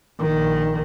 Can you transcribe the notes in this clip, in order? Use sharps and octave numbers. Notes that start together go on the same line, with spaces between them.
A#1 D#3